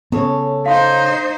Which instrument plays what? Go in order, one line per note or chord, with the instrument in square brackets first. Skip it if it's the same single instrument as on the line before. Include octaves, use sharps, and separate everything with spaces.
[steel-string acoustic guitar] C#3 A4 C#5 [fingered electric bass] B3
[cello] D#4 C5 [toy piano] F5 C6